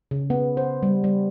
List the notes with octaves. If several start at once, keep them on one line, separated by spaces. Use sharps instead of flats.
C#3
B3
C5
G3
G3